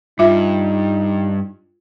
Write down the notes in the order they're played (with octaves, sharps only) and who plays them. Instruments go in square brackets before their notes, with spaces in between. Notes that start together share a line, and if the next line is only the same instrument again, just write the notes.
[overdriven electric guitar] G2 [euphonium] D#4 [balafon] F4 E5